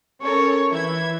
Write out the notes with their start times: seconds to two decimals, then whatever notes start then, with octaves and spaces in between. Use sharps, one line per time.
0.22 C#4 A4 A#4 C#5
0.71 E3 E5 G#6